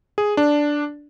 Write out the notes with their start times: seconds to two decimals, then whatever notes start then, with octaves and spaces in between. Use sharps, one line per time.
0.18 G#4
0.37 D4